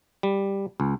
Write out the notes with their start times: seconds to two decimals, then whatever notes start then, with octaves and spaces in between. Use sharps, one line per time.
0.23 G3
0.80 C#2